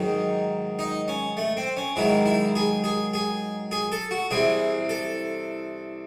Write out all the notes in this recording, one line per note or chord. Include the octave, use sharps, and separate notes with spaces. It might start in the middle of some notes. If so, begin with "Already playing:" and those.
Already playing: G#2 D#3 F#3 D#4
D#4
C#4
A3
C4
C#4
G#2 D#3 F#3 E4
E4
G#4
G#4
G#4
G#4
A4
F#4
C2 C3 E3 G#4
A4